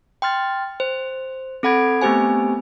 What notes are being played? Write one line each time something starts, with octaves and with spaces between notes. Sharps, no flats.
G5 C6 F6 A6
C5
C4 A4 F#5 B5 G#6 D7
A3 B3 C4 G4 C5 G#5